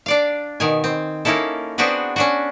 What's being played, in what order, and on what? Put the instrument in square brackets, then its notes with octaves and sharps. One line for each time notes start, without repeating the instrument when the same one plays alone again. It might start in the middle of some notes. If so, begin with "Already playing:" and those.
[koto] D4 D5 F5
B2 D#3 G#5
C4
A#3 C#4 D#4 E4 A4
B3 C4 D4 F#4 G#4 B4
C#4 D4 F#4